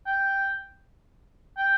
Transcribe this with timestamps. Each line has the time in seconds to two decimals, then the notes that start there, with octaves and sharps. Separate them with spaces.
0.06 G5
1.57 G5